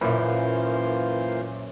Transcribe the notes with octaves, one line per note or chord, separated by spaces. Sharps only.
F#2 A#2 E3 A#3 F4 C5 B5